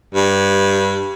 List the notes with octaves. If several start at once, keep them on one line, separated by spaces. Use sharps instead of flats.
G2